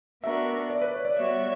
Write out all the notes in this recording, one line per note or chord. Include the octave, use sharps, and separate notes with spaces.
B3 D4 F#4 A#4 E5
D5
B4
C#5
D5
G3 B3 F#4 C#5 D5 E5